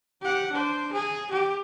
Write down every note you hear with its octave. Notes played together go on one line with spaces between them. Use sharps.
G4 F#5
D4 C5
G#4
G4